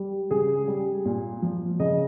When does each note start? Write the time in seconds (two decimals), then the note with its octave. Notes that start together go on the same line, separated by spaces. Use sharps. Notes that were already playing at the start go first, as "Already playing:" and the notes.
Already playing: G3
0.31 C#3 G#4
0.68 G3
1.05 A#2
1.42 F3
1.80 C#3 D#5